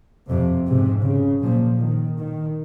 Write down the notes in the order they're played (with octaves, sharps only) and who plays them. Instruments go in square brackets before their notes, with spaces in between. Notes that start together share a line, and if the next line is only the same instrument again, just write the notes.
[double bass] F2 [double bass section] C3
[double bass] G#2 [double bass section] C3
[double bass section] C#3
[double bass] A#2 [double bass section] F3
[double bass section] D#3
D#3